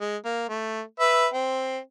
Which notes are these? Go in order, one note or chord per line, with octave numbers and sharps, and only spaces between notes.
G#3
A#3
A3
B4 E5
C4